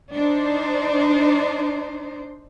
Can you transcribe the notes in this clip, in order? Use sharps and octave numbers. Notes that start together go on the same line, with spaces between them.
D4 D#4 C5